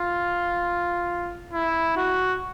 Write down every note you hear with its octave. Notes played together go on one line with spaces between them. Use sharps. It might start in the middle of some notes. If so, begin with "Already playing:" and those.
Already playing: F4
E4
F#4